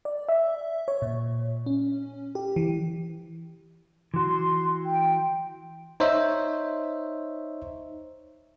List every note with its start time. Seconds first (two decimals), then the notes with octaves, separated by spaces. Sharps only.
0.05 D5
0.29 E5
0.88 C#5
1.02 A#2
1.66 C#4
2.35 G4
2.56 E3
4.14 E3 F#4 C6
4.85 G5
6.00 D#4 C5 C#5 E5